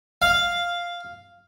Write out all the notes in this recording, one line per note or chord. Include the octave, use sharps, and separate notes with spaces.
F5